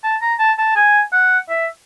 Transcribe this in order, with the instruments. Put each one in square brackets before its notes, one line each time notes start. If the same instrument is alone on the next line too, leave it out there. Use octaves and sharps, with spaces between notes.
[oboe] A5
A#5
A5
A5
G#5
F#5
E5